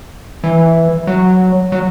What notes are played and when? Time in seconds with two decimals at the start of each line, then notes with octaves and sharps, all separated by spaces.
0.44 E3
1.07 F#3
1.72 F#3